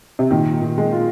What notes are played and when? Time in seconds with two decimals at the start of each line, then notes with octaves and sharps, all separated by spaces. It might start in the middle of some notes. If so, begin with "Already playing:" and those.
0.19 C3
0.31 A#2 D#3
0.62 A#2
0.78 G#3
0.92 F4